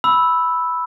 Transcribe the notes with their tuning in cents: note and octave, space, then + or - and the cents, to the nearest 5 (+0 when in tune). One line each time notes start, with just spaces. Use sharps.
B5 +0 E6 -5